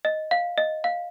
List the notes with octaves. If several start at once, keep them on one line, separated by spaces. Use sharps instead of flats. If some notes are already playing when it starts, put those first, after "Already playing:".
D#5
F5
D#5
F5